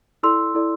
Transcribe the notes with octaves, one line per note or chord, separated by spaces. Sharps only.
E4 A4 D5 C6 E6
E4 A4 D5